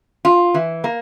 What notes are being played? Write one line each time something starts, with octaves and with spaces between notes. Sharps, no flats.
F4
E3
A#3